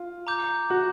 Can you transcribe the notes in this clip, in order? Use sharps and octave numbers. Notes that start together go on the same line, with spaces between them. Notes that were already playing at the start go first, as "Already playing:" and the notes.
Already playing: F4
A#5 D6 G6
F#4